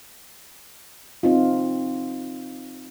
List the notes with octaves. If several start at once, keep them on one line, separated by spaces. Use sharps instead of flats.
C4 D#4 F4